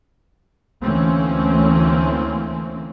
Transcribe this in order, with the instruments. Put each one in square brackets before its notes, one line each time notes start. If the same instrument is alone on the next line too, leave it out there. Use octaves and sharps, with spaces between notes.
[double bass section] D2 E3 A3 A#3 C4 C#4